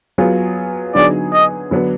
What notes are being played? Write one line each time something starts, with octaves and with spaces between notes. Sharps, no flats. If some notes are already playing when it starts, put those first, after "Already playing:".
F#3 B3 F4 G#4
D3 F#3 B3 D#4 G#4 D5
D#5
D3 F#3 B3 D4